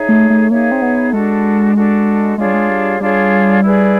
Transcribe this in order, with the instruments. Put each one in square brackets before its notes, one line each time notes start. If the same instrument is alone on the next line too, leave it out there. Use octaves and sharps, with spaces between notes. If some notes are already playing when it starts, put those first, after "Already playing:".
Already playing: [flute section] D#4 G#4 C#5 E5
[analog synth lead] A3
A3
[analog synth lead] A#3 [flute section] D#4 G#4 C#5 E5
[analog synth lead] C4
B3
[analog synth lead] G#3 [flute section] D4 F#4 A4
[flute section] D4 F#4 A4
[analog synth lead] G#3 [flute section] D4 F4 G#4 C#5
[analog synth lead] G3
G#3
G3
[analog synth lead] G3 [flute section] D4 F4 G#4 C#5
[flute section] E4 G#4 B4 D5